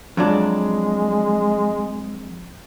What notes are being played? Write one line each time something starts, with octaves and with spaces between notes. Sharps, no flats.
F2 F#3 G#3 D4